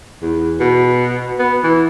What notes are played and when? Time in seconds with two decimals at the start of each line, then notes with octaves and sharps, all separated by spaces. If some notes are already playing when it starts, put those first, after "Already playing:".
0.22 E2
0.60 B2
1.39 B3
1.64 E3